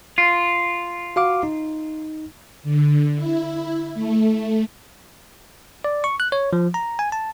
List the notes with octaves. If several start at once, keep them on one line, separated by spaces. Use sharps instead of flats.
F4
F#4 F5 D6
D#4
D3
E4
A3
D5
C#6
F#6
C#5
F3
A#5
G#5
A5